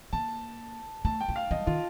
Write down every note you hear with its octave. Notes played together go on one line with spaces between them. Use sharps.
A#3 A5
A3 A5
G5
A3
F5
G3 D#5
D#3 F4